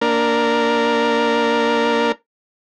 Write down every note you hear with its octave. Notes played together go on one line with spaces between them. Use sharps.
A#3 D4 A#4